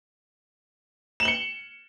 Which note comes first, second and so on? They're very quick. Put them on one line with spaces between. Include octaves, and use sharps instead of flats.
E7 F#7 G7 C#7